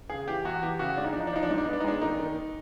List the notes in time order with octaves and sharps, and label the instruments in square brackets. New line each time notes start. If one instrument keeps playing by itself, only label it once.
[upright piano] C#3 G#4
E3 G4
E2 F#4
E3 G4
C#3 F#4
G#3 D4
D#4
F3 D4
D#4
D4
F3 D#4
D4
G#2 D#4
D4
B3 D#4
D4
D#4
G#3 D4
D#3 D#4
D#3